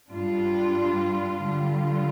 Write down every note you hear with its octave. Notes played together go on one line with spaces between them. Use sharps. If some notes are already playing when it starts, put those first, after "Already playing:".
G2 G3 D4 F4
D3 G3 F4